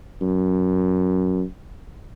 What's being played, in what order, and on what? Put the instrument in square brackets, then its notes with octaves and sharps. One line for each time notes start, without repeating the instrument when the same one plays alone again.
[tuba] F#2